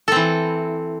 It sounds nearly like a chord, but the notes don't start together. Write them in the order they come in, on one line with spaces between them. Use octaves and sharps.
A4 C4 E3